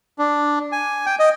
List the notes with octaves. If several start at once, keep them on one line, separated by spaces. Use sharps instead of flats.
D4
G#5
G5
D#5